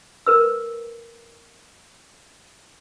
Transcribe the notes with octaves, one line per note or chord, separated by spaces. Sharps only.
A#4 B4 E6